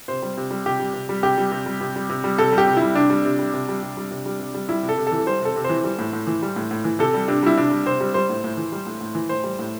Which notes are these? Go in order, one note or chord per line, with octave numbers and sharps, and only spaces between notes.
C3 C5
G3
C3
G3
C3 G4
G3
C3
G3
C3 G4
G3
C3
G3
C3
G3
C3
G3
C3 A4
G3
G4
C3
E4
G3
C3 D4
G3
C3
G3
C3
G3
C3
G3
C3
G3
C3
G3
G3 E4
C3
A4
C3
A4
E3
G3 C5
C3 A4
C3
C5
E3
G3
A2
A2
E3
G3
A2
A2
E3
C3 A4
G3
C3 D4
G3 E4
C3 D4
G3
C3 C5
G3
G3 C5
A2
A2
E3
G3
A2
A2
E3
A2 C5
G3
A2